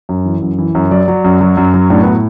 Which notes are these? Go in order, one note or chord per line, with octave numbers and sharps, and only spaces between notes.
F#2
E3
F#2
E3
F#2
F#3 D5
F#3
F#2
F#3
F#2
F#3
A2 D4
B3
A2